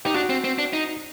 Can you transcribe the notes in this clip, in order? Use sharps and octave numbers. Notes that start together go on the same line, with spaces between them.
D#4 G4
D4 F#4
C4
C4
D4
D#4